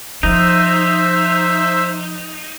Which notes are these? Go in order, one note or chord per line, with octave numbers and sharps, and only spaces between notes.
F3 D#4 C5 E5